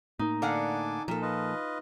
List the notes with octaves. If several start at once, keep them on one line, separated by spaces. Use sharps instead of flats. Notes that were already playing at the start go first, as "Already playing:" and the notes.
A2 A#3 D#4
D3 A4 F5 F#5 G#5 D6
A#2 F3 A#3 A4
F4 B4 D#5